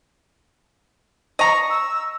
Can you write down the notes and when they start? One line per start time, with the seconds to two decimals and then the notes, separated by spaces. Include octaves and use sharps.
1.39 D#5 A#5 C#6
1.70 E6